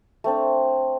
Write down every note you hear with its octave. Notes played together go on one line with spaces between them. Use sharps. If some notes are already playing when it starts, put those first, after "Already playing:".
A3 C4 D4